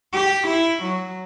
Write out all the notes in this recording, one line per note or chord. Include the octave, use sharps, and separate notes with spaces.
G4
E4
F#3